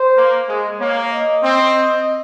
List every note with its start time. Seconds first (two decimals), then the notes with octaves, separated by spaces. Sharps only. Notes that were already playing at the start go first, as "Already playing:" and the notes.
Already playing: C5
0.17 A#3
0.48 G#3
0.80 A#3 C#5
1.11 D#5
1.43 C4